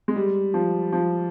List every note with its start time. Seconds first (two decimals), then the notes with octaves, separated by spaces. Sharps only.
0.08 G#3
0.16 G3
0.54 F3
0.92 F3